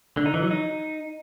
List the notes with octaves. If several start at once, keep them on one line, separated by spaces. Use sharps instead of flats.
D3
D#4
E3
F#3
D#4